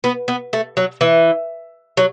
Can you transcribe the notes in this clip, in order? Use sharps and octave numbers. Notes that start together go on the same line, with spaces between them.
B3
B3
A3
F#3
E3
F#3